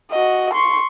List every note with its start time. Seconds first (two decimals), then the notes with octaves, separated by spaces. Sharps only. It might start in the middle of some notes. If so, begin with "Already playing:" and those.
0.12 F#4 D#5
0.54 C6 C#6